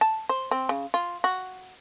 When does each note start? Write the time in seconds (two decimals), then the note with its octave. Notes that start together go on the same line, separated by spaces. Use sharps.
0.01 A5
0.29 C5
0.51 C4
0.69 C#3
0.94 F4
1.24 F#4